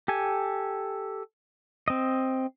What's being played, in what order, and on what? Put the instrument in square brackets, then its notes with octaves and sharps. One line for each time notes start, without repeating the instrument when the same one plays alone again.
[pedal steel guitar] G4 A4 G#5
C4 D#5